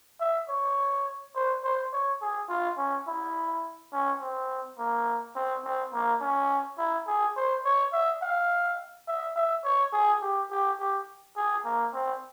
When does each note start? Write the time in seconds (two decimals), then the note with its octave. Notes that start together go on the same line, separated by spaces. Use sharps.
0.20 E5
0.48 C#5
1.35 C5
1.64 C5
1.93 C#5
2.21 G#4
2.49 F4
2.77 C#4
3.07 E4
3.92 C#4
4.21 C4
4.78 A#3
5.35 C4
5.65 C4
5.93 A#3
6.21 C#4
6.78 E4
7.07 G#4
7.36 C5
7.65 C#5
7.93 E5
8.22 F5
9.08 E5
9.36 E5
9.64 C#5
9.93 G#4
10.22 G4
10.51 G4
10.79 G4
11.37 G#4
11.65 A#3
11.94 C4